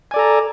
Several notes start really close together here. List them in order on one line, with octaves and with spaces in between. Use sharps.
G#5 D5 A4 A#5